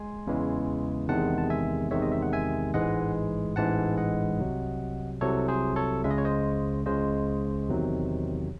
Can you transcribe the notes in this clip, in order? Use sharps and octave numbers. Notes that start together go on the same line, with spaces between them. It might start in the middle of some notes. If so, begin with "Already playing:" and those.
Already playing: G#3 G#5 C6
E2 C#3 E3 G#3
E2 C3 D#3 G#3 F#5 A5
A5
E5 G#5
E2 C3 D#3 G#3 C#5 E5
D#5
E5
F#5
E5 G#5
A1 G#2 E3 G#3 D#5 F#5
A1 G#2 E3 G#3 F#5 A5
D#5 F#5
C2 C3 F#3
C2 C3 F#3 A4 C#5
G#4 C5
A4 C#5
C#2 C#3 G#3 E5
D#5
C#5
C5 D#5
C#2 C#3 G#3 C5 D#5
E2 C3 D#3 F#3